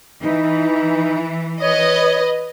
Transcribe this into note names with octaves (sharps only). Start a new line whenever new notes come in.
E3 D#4
B4 C#5 D#5